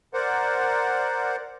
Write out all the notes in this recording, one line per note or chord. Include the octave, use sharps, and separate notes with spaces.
A#4 C5 D5 F#5